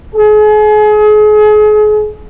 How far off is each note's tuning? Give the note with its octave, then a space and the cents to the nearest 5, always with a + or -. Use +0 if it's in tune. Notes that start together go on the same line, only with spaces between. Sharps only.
G#4 +35